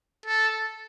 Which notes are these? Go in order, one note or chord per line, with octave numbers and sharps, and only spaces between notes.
A4